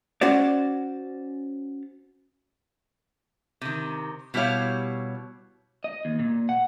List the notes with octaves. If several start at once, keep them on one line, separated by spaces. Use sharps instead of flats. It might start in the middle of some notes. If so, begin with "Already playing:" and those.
C#4 F#4 C5 D5
C3 D#3
B2 G3 E4 G4 C#5 F5
D#5
D#2
A#2
F#5